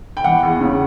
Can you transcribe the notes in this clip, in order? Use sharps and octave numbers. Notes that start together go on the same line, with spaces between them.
G5
E3 F#5
E2
C#3